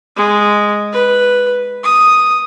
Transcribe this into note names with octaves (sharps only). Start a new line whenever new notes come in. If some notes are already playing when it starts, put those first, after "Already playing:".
G#3
B4
D#6